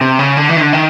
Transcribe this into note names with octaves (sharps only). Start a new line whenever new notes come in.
C3
C#3
D3
E3
D#3
D3
D#3